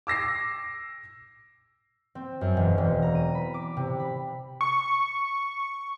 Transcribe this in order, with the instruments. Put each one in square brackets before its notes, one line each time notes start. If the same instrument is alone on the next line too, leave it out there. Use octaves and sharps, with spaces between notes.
[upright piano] D6 E6 A#6 C7
[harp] C4
F#2
E1
E1
A#5
D#7
B5
D6
C3
B5
[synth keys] C#6